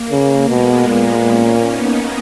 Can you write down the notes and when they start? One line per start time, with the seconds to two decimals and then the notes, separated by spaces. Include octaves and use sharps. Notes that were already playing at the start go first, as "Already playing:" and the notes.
Already playing: A#3
0.11 C#3
0.50 B2 G#3 B3
0.88 A#2
1.28 A#3 C#4
1.67 B3 D#4